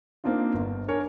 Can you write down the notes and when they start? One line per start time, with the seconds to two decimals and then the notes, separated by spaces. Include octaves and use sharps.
0.24 A#3 C4 D4 D#4 F4
0.54 G1
0.88 D4 A#4 C#5 G#5